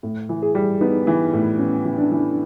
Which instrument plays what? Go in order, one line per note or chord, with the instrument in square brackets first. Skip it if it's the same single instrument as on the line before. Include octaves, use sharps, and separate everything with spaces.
[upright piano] A2
E3
[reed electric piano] G#4
[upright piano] G3
[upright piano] B3 [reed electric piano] D#4
[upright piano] E3
A2
[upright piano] B3 [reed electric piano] C#4
[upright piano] E3
[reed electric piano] D4
[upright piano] E3